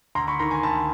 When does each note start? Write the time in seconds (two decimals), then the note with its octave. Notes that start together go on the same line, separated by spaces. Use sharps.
0.15 D2 A#5 C6
0.27 B5 C#6
0.39 D#3 A#5 C6
0.50 G#5 A#5
0.63 D2 A5 B5